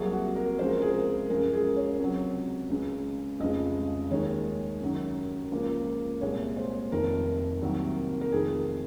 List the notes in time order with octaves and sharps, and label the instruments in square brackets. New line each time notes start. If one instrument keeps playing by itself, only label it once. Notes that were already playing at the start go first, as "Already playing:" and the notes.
Already playing: [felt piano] C2 C3 F#3 A#3 G#4
F#4
A#4
C#2 C3 F3 G#3 C5
A#4
G#4
A#4
F#2 F3 G#3 A#4
G#4
C#5
C#2 C3 F#3
C#2 C#3 G#3
F1 F2 C#3 F3 G#3 D#5
D#2 D#3 G#3 C#5
F#2 D#3 F#3
C#2 C#3 F3 A#3
C2 A#2 G#3 C#5
C5
F1 F2 D#3 A#4
C2 C3 D#3 F#3 A#3
A#4
F1 F2 D#3 G#4